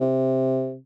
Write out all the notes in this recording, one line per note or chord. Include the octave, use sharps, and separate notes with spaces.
C3